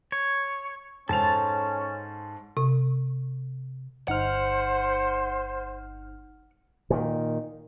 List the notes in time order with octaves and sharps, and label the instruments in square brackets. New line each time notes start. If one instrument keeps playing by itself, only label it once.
[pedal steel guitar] C#5
[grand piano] G#2 C5 F7 [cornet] C#4 [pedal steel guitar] A4 A5
[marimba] C3
[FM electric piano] G1 D#4 F6 [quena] C5 [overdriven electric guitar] F#5
[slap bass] A#2 D#3